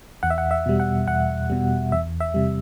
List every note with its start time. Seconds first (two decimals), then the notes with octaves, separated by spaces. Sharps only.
0.23 E2 F#5
0.30 E5
0.38 F#5
0.51 E5
0.66 B2 G3
0.80 F#5
1.07 E2 F#5
1.50 B2 G3
1.92 E2 E5
2.21 E5
2.34 C3 G3